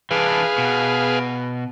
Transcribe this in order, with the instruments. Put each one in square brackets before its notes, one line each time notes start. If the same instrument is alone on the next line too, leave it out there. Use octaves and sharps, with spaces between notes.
[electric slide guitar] E3 D4 [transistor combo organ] G#4 B4 F5
[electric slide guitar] B2